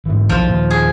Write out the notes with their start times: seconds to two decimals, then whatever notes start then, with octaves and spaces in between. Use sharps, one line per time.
0.06 G#2 E3
0.29 B1 F2 E3 F3 F4
0.47 D#2 A#2
0.70 G#4